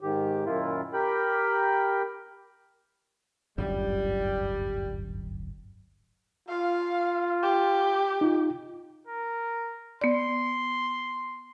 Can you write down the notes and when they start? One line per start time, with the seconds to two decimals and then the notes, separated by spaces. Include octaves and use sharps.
0.01 G#2 D#3 G4
0.46 F#2 A#2 D#3 E4 F4
0.93 G4 A#4 G5 B5
3.58 D1 G1 F#2 G3
6.49 F4 F5
7.43 G4
8.21 D#4 F4
9.07 A#4
10.01 B3 D5 C6